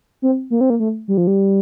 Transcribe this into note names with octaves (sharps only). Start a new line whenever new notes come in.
C4
A#3
C4
A#3
A3
G3
F3
G3